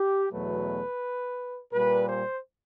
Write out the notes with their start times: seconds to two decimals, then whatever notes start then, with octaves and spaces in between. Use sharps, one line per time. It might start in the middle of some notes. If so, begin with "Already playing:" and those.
Already playing: G4
0.32 E2 B2 F#3 A3 B4
1.72 A#2 G3 B4
2.08 C5